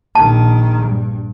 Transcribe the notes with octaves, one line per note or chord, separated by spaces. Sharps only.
A#1 D#3 A5
G2